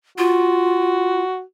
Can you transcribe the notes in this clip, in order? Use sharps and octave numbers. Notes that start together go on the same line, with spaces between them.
F4 F#4